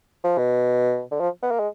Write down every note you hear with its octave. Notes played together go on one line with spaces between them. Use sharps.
F3
B2
D3
F3
B3
A#3
G#3